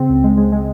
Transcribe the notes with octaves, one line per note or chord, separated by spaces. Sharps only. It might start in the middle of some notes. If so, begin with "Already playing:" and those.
Already playing: C#3 C4
C#2
G#3
G#3
G#3